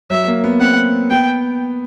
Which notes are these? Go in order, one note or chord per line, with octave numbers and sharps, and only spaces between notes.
F#3 E5
A#3
B3
C4 F#5
B3 G5